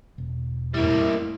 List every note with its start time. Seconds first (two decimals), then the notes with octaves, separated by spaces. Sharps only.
0.18 E1
0.74 F2 A2 G3 A#3 E4